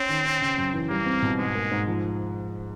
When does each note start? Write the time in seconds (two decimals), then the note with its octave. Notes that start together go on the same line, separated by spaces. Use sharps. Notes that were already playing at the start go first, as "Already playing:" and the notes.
Already playing: C4 C#4
0.09 D#3
0.25 C#4
0.41 C#3
0.57 F#2
0.73 E3
0.90 G3 A#3
1.06 C4
1.22 B2
1.39 G#2 G#3
1.55 A#3
1.72 G#2
1.88 F3